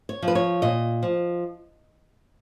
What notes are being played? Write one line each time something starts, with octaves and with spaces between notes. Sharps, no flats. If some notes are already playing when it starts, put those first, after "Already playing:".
C#5
F3
B4
C#5
A#2 D#5
F3